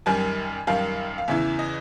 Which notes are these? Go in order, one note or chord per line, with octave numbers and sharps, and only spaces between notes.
F#2 D#3 G3 G#5
F#2 D#3 G3 F5
F5
E2 C#3 E3 E5
D#5